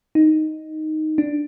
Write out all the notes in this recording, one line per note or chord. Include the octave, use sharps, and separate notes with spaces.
D#4
D4